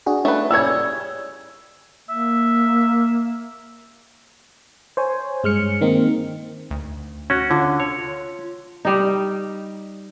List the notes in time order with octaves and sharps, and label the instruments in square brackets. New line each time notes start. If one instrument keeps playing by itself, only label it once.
[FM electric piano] D4 F#4 G#4
[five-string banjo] A3 B4 [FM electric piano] C#4 D#4 A4
[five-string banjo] G3 G#4 C#5 [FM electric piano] D5 [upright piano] E6 G#6
[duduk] A#3 [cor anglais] E5
[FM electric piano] C5 C#5 G#5
G2 G#3 F6 C#7
D#3 A#3 C4 D#4
[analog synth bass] D2
[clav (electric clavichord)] C#4 F#4
[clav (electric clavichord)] D3 [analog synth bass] F4
[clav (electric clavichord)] C#5
[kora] G3 D#4